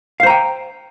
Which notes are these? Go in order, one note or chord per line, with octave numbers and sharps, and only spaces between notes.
C5 F5 G5 A#5